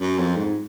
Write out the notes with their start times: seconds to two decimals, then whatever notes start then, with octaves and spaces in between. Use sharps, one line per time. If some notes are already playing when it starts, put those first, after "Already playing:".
0.01 F#2
0.18 F2
0.36 G#2